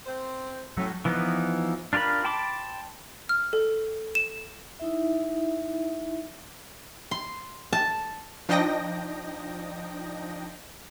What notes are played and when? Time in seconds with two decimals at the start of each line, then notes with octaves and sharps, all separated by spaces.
0.06 C4 C5
0.77 A2 F#3 A3 C#4
1.05 E3 F3 B3 D#4
1.93 D4 F4 G4 A#4 B5
2.25 G5 A5 B5 C6 D6
3.29 F6
3.53 A4
4.15 E7
4.80 D#4 E4 E5
7.11 C6
7.73 A5
8.49 F3 D4 D#4 D#5 G5 A#6